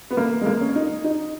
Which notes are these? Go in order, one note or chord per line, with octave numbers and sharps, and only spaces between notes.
B3
A#3
G#3
A#3
C#4
D#4
D#4